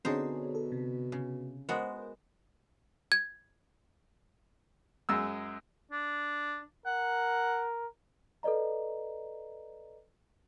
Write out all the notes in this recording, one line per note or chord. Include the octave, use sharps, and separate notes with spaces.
B2 D3 C4 D#4 G#4 C5 C#5
A4
C3
C#3
G#3 B3 F#4 A#4 C5
G#6
F#2 G#3 E6
D4
A#4 F#5
A4 B4 D5 D#5 A#5